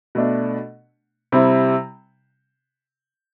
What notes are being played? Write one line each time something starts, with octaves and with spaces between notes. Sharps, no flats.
B2 A3 D4
C3 G3 C4 E4